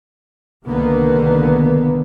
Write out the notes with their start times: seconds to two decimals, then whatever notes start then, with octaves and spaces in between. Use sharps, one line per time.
0.64 C2 D3 D#3 A#3 B3